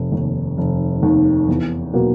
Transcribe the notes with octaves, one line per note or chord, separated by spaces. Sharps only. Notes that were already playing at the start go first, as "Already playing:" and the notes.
Already playing: F1
D#2 D#3
F1
D#2 D#3
E2
B2 F#3 A#3